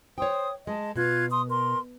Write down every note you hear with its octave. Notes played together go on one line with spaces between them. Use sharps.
C5 C#5 G5 D#6
G#3 D#5 A5
B2 F4 F#6 G#6
C6 D#6
A#4 C6